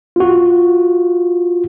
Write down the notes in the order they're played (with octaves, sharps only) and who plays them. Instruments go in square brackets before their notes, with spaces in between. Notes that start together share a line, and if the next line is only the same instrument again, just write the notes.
[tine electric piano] F4 F#4